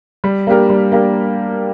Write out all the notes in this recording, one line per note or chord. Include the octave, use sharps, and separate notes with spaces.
G3
A#3 D4 G4 A#4
G3
A#3 D4 G4 A#4